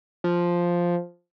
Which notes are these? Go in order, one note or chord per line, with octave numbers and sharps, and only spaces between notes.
F3